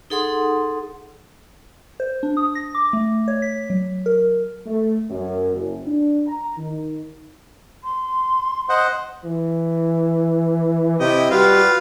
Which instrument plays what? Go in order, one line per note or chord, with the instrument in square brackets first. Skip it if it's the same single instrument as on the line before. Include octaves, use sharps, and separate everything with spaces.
[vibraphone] D#4 G#4 A4 F#5 C6 D#6
[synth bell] C5
D4
D#6
A#6
D6
A3
C#5
B6
F#3
A#4
[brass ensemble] A3
F#2
F#1
D4
A#5
D#3
[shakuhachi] C6
[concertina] C5 D#5 F#5
[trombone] E3
[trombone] C3 [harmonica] E4 D#5 G5
[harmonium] G3 [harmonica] F4 B4 F5 [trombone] F#4